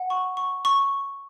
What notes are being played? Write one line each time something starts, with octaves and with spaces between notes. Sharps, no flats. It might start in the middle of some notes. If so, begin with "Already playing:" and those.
Already playing: F#5
C#6
C#6
C#6